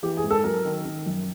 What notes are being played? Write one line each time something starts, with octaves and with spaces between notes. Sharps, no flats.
E3 G4
G#4
G#2
A4
F#3 A#4
D#3
D#3
F#2